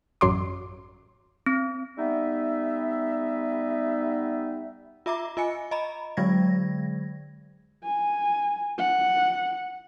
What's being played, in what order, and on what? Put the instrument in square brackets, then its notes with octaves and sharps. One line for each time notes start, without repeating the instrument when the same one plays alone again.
[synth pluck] A1 F#2 F#3 C6 D6
[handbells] C4
[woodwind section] G3 B3 D#4 E5
[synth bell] F4 E5 A#5 D6
F4 D#5 G#5 C#7
D#5 A#5 B5
D3 F#3 G#3 G#6 A#6
[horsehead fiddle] G#5
F#5